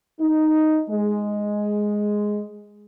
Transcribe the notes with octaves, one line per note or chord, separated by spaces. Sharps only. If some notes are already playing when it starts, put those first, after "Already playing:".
D#4
G#3